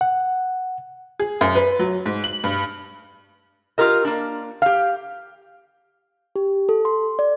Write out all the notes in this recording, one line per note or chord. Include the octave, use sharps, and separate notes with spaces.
F#5
G#4
F#2
B4
F#3
G#2
F#7
G2
F4 G4 A#4 D#5
A#3 D4
G4 F5
G4
A4
C6
D5